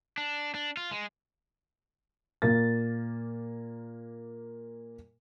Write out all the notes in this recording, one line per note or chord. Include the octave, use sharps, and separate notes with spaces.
D4
D4
F4
G#3
A#2 A#3 A6